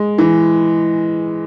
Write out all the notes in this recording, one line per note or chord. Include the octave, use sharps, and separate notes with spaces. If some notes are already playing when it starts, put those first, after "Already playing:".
Already playing: G#3
E3